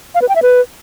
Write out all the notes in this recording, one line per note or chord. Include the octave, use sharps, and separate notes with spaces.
F5
B4
G5
E5
B4